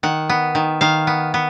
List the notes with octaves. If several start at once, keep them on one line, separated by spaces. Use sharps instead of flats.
D#3 F#5
B3
D#3
D#3 F5
B3
B3